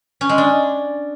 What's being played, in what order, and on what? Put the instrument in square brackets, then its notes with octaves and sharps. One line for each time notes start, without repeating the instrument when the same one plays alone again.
[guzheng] C#4
G#3
D4